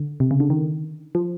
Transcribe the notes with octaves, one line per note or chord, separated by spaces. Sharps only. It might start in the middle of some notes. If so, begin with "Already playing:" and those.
Already playing: D3
C3
C#3
D3
D#3
F3